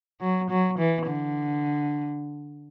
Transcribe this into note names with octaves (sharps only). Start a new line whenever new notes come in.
F#3
F#3
E3
D3